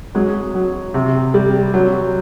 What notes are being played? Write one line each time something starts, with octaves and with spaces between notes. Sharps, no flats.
F#3 G#3
F#3
C3
G3
F#3